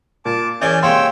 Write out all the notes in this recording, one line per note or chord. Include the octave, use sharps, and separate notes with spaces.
A#2 A5 D6
E3 C#4 G#4 A#4 D5 G#5 G6
C3 G#3 A#3 C#5 G5 C6 E6